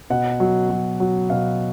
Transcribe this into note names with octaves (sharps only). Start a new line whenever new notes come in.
B2 F#5
F#3
F#3
F#3
B2 F5